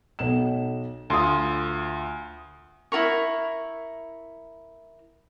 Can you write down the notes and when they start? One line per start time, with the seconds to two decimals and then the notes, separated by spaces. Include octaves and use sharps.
0.19 B1 E7
1.10 D2 F4 C6 D#6
2.92 E4 F4 A#4 C#6